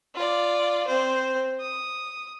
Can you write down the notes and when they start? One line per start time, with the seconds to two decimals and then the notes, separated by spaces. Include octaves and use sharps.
0.15 F4 D5
0.87 C4 C5
1.60 D#6